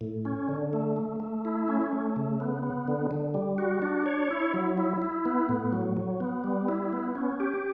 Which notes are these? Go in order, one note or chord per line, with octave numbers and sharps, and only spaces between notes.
A2
C#4
D3
A3
A3
A3
E4
C#4
A3
C#3
B3
B3
D3
D3
G3
F#4
D4
C#5
E4
F#3
E4
E4
B3
A2
F#3
F#3
B3
G3
E4
B3
C#4
G4